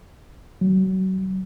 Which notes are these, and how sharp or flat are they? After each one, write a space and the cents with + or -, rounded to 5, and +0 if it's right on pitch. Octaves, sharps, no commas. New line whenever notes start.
F#3 +25